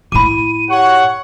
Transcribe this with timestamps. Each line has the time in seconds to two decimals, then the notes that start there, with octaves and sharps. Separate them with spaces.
0.12 A2 E4 B5 D6 D#7
0.70 G4 C#5 F#5 C#6